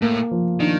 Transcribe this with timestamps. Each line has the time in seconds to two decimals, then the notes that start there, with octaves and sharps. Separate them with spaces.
0.02 A2 A#3
0.31 F3
0.60 D#3 D4